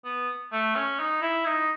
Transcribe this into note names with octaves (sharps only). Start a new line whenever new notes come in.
B3
A3
C#4
D#4
E4
D#4